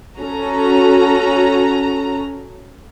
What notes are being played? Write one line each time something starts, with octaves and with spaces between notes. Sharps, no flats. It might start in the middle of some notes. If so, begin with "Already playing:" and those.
C#4 F#4 A4 A#5